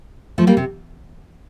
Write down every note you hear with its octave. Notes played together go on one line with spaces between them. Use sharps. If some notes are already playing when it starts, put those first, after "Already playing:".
F3 A3
G3 A#3
C3